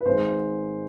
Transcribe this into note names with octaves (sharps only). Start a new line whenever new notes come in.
B4
G#1 G#2 G#3 C5